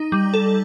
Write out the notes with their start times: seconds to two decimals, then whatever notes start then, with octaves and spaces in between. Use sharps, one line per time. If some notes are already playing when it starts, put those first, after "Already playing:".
Already playing: D#4
0.12 G3
0.34 A4